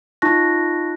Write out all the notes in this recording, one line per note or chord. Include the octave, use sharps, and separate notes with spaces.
D#4 F4 A5 C#6 F#6 A#6